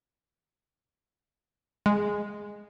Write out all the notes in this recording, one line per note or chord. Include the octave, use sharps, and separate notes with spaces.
G#3